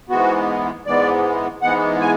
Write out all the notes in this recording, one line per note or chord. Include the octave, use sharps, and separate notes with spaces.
G#2 E3 G#3 B3 F#4
G#2 E3 G#3 B3 D5
G#2 E3 G#3 B3 F#5
G#5